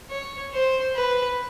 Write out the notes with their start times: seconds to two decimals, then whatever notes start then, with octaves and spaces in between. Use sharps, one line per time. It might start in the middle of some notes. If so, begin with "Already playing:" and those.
0.10 C#5
0.53 C5
0.95 B4